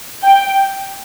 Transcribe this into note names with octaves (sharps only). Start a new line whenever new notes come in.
G5